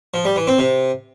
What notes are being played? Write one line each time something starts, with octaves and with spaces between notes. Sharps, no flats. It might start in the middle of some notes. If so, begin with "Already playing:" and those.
F3
G3
E3
C4
C3